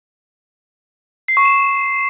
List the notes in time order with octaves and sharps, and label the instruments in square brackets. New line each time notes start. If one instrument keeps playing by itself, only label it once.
[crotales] C7
C#6
E7